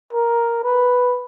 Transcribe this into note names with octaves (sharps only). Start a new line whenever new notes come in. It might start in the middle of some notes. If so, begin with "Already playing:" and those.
A#4
B4